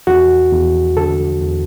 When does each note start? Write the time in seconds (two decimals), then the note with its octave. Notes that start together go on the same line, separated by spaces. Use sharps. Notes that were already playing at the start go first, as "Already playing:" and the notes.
0.07 E2 F#4
0.52 E2
0.96 D3 A4
1.40 E2